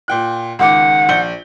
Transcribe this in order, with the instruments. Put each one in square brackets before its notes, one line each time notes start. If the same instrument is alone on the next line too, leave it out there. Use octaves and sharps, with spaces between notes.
[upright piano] A#2 G5 F#6
[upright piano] C#2 D#3 D6 [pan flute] F#5
[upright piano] A#1 G6 G7